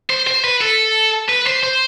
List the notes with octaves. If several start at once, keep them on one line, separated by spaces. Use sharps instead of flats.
C5
C5
B4
A4
B4
C5
C5